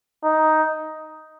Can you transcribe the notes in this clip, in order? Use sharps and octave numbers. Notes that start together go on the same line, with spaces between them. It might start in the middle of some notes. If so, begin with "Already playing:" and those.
D#4